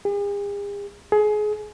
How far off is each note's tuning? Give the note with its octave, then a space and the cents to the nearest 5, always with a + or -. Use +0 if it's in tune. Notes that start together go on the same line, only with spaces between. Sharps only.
G#4 -45
G#4 +25